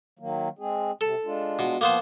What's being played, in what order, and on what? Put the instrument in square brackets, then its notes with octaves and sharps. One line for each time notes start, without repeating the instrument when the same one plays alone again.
[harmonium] D#3 F#3 A#3
G#3 C4 G#4
[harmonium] C3 [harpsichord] A4
[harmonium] G#3 D4 F4
[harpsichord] B2
[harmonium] F3 [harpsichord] A#3 B3 C5